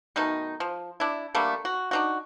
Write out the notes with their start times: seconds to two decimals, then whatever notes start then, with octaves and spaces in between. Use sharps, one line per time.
0.16 B2 D#3 A3 D#4
0.60 F3
1.00 D4 E4
1.35 D3 G3 A3 A#3
1.65 F#4
1.91 D4 D#4 F#4